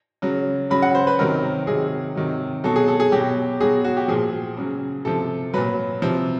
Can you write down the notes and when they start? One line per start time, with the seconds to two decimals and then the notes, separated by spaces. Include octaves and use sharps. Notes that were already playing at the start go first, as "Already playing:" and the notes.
0.22 C#3 F#3
0.70 C#3 F#3 B5
0.82 F#5
0.95 C5
1.07 B4
1.19 C3 D#3 F#3 A#4
1.67 C3 D#3 F#3 G#4
2.15 C3 D#3 F#3
2.64 B2 F#3 A4
2.76 G#4
2.88 A4
3.00 G#4
3.12 B2 F#3 G4
3.60 B2 F#3 G#4
3.84 F#4
3.97 G4
4.08 A#2 F3 G#4
4.57 C#3 F#3
5.05 C3 F3 A4
5.54 A#2 F#3 B4
6.02 C3 F3